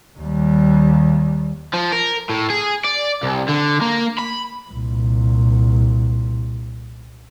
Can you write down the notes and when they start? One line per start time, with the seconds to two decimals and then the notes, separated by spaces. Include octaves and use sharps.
0.18 D#2 G3
1.74 F3
1.93 A#4
2.30 A2
2.50 G#4
2.84 D5
3.23 C2
3.48 D3
3.81 A#3
4.19 B5
4.71 C2 A#2